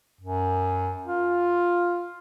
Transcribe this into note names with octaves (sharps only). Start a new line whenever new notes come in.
F#2
F4